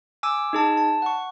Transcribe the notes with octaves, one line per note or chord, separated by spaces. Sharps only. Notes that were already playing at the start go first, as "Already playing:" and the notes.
G#5 D6 E6
D#4 G#4 A5
A5
F#5 C#6